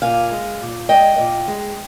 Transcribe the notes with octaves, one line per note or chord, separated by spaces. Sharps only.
A#2 F5 G#5
G#3
A#2
G#3 D#5 G5
A#2
G#3